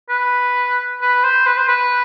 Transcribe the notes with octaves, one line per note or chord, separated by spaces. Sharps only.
B4
B4
C5
B4
C5
B4